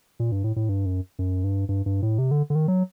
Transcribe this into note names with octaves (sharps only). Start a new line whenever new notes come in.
A#2
G2
A2
A2
G2
F#2
F#2
G2
G2
G2
A2
C3
D3
D3
D#3
F#3